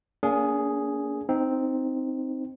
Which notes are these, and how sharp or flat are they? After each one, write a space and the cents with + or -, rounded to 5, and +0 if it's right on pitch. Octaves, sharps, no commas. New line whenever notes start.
A#3 +0 D4 -45 G#4 +0
C4 +0 D#4 +0